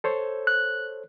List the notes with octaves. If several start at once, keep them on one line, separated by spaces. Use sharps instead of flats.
A4 C5 C#5
F#6